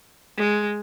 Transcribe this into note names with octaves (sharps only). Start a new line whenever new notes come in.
G#3